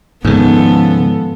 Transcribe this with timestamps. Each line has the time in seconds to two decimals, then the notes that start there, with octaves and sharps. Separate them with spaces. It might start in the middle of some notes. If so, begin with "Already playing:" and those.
0.25 C#2 G#2 D#3 F3 B3 A4